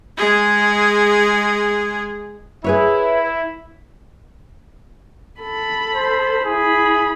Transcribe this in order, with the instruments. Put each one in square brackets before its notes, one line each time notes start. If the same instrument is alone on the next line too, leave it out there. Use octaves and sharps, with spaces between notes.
[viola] G#3 G#4
[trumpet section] E4 [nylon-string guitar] G#4 B4 C#5
[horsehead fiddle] A4 B5
[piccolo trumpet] C5
[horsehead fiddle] E4 B5 [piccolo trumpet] G#4